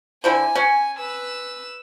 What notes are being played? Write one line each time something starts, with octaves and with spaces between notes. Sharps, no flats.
D3 E4 C5 G#5
C#4
B4 E6